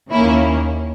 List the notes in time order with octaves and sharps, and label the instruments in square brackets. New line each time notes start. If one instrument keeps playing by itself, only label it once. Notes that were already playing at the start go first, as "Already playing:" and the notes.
[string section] D#2 D#3 A#3 C#4 E4